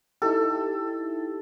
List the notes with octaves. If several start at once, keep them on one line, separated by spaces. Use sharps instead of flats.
D#4 E4 G4 A4